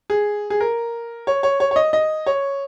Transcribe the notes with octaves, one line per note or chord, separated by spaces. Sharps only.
G#4
G#4
A#4
C#5
C#5
C#5
C#5
D#5
D#5
C#5